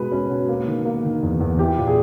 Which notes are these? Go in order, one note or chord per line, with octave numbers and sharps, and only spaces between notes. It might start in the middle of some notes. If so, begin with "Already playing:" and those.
Already playing: B2 G#3 B4
C#4
B2
A#3
D#3
A#3
D#3
E2
E2
E4 G4
A#2
G#4